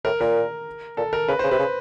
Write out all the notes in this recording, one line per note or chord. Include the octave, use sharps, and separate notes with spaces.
A2 A#4
A#2 A#4
A#2 A4
A#4
C#3 B4
C#3 C5
C3 B4
C#3